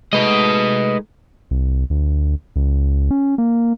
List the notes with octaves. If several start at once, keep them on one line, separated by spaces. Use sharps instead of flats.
G#3 A3 D#4 B4 D#5
C2
D2
C#2
C#4
A#3